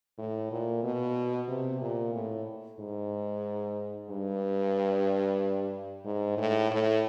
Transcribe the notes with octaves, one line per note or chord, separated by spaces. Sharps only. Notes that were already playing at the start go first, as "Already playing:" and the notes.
A2
A#2
B2
C3
A#2
A2
G#2
G2
G#2
A2
A2